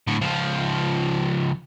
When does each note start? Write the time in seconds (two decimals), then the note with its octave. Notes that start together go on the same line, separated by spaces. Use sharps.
0.07 A2 D3
0.21 C#2 F3